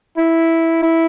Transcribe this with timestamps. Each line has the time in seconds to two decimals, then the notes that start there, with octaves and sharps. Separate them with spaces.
0.17 E4
0.83 E4